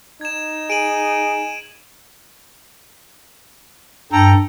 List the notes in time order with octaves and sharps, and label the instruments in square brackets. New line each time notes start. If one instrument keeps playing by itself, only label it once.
[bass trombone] D#4 [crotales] G#6 E7
[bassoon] G#4 [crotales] D7 D#7 F#7
[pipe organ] G2 [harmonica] A4 G5 A#5